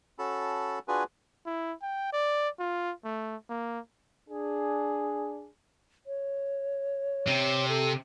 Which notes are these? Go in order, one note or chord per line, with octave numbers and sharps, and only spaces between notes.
C#4 F#4 A4 A5 B5
D4 F4 F#4 G#4 B4 G#5
E4
G5
D5
F4
A3
A#3
D4 G#4
C#5
C3
A4